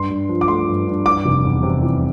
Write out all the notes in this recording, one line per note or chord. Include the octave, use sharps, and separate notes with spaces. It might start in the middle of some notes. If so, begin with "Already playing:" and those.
Already playing: G2 C6
G2
F3
D6
A3 C6
G2
G2
E3 D6
F1
E2
C3
E3